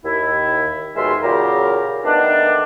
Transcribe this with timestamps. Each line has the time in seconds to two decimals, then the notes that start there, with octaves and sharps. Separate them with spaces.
0.04 D#2 E4
0.96 D#2 B2 G#3 F4 E5 C6
1.23 A#2 C#3 F#3 G4 A#4
2.05 D#3 A3 B3 D4